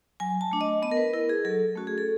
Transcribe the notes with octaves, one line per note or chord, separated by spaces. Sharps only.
F#3 G#5
A5
A3 D4
D#5
B3 D#5
A#4
B4
E4 A#4
G#4
F#3 A4
A3 C#4 F#4
G#4
A4